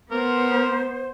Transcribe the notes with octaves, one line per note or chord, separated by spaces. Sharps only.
B3 A#4 C5